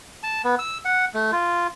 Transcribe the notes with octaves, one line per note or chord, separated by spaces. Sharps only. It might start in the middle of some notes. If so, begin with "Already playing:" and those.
A5
B3
E6
F#5
A3
F4